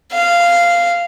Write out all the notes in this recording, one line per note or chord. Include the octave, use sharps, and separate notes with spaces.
F5